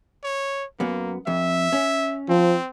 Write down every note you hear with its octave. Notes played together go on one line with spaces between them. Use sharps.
C#5
F#2 A#3 B3
F2 E5
C#4
F3 C4